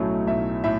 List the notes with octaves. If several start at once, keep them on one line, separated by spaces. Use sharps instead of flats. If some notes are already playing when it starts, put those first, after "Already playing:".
Already playing: B1 A2 F#3 A3 C#4
B1 E5
A2 E5